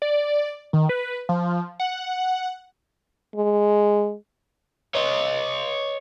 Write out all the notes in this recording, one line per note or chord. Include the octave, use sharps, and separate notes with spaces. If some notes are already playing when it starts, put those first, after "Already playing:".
D5
D#3
B4
F3
F#5
G#3
C#5 D#5